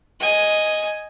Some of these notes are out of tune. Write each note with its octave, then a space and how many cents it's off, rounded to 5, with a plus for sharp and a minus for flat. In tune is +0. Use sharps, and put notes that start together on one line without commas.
D#5 +0 G#5 +0